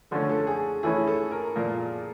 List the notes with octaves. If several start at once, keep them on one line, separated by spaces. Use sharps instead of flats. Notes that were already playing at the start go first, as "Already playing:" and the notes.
D3 F3 A3 C#4 A4
A4
A4
G#4
E3 A3 C#4 E4 G#4
A4
A#4
A#2 F3 A#3